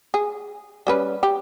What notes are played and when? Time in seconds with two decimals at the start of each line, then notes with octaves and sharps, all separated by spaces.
0.14 G#4
0.87 G3 C#4 B4
1.23 G4